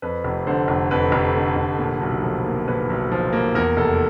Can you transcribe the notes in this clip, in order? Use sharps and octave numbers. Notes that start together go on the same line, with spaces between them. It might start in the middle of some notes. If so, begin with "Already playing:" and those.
F2 B4
F1
D3 C5
F1
F2 B4
F1
D3
F1
A#2
B1
F3
A#3
A#2 B4
B1
F3
A#3
E2 A#4
F1 A4